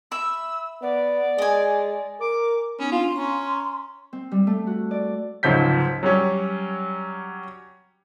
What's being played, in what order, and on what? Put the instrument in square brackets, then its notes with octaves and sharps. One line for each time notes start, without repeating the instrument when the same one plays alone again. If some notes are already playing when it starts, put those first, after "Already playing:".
[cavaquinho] E5 B5 [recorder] E6
[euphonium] B3 [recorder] D5
[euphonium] G#3 [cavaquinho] D#5 G#5
[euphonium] A#4 [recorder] D6
[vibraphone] B3 D#4 [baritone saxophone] C#4
[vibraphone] C4 D4 [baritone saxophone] F4 [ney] C6
[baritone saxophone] C#4 [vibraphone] A#5 C#6
[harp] C4
G3
A3
F#4
D5
[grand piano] C#2 G#2 F3 F#3 G6 B6
F#3 G3 C#4